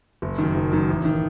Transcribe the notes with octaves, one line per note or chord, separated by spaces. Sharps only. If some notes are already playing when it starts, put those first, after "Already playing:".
F#1
F#2 D#3
F#1
F#2 D#3
A1
D#3